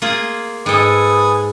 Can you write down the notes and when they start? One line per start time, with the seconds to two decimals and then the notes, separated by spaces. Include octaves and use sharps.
0.02 A#3 F4 G#4
0.66 G#2 A4 B4 G#5 D#6